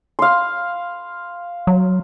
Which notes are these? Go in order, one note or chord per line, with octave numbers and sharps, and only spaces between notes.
F5 C6
F#3